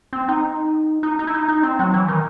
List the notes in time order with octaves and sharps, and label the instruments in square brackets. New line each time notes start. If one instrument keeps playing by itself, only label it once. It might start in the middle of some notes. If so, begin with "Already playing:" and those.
[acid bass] C4
D#4
D#4
D#4
E4
D#4
D#4
C4
F#3
E3
D#3